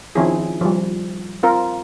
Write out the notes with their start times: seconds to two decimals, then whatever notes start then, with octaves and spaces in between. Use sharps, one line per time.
0.15 D#3 F3 C4 C#4 E4 G#4
0.61 F3 G3
1.43 C4 F4 A#4